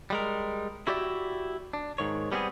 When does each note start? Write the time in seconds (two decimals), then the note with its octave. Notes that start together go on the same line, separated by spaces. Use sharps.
0.10 G3 G#3 A#4
0.87 E4 F#4 G4 D5 E5
1.73 D4
1.98 G#2 D#3 C#5
2.32 G3 B3 C4 F#4 G#4